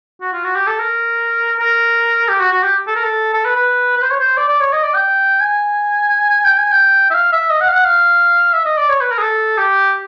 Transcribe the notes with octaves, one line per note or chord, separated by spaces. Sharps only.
F#4
F4
F#4
G4
A4
A#4
A#4
G4
F#4
F#4
G4
A4
A#4
A4
A4
B4
B4
B4
C5
C#5
C5
D5
D5
C#5
D#5
D5
G5
G#5
G5
G#5
G5
E5
F5
E5
D#5
F#5
F5
F#5
F5
E5
D#5
D5
C#5
B4
A#4
G#4
A4
G4